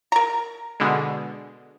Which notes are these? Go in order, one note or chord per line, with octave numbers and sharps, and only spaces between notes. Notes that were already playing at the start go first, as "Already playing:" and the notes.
A#4 A#5
B2 D3 G#3